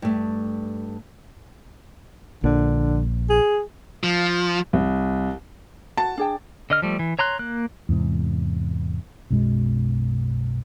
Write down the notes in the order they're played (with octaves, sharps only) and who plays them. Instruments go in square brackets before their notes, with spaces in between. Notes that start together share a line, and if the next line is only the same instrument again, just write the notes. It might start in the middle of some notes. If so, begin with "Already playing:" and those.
[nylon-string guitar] G2 A3
[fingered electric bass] A#1 [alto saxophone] D3
[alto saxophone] G#4
[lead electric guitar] F3
[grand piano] C2
[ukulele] F#4 [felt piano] A5
[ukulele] D4 G#4 G5
[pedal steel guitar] D3 D#5 F6
F3 G3 A3
E3
C#5 A#5 C6 F#6
A#3 F#6
[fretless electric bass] E2 G#2 C3
B1 F#2 B2 G#3